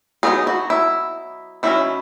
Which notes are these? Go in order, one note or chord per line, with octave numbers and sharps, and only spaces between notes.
F#3 B3 D#4 G#4
F#4
E4
D#3 F#3 C#4 E4